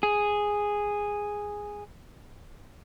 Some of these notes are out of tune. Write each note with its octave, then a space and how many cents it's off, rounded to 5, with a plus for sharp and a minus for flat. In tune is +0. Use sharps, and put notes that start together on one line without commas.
G#4 -5